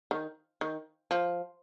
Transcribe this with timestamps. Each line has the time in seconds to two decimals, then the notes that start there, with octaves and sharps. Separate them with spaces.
0.11 D#3
0.61 D#3
1.11 F3